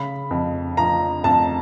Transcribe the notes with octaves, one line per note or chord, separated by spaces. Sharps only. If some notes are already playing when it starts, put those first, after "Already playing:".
Already playing: C#3 B5
F2
F3 A#5
F2 A5